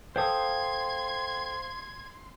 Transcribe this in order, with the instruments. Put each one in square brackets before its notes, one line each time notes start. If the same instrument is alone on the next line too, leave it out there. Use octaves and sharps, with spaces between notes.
[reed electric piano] A4 G5 [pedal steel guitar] C5 F5 D#6 [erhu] C6 [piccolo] G#6